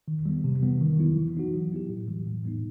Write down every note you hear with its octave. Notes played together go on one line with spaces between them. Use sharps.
D#3
G3 B3
C3
E3 G3 B3
D#3
F#3 B3 E4
E3
B3 D#4 F#4
F#3
B3 E4 G4
A2
E3 G3
A2
G3 B3 D#4